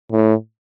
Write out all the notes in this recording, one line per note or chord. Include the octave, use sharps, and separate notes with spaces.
A2